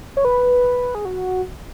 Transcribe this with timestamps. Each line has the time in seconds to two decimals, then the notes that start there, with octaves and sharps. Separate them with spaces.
0.17 C#5
0.25 B4
0.95 G#4
1.05 F#4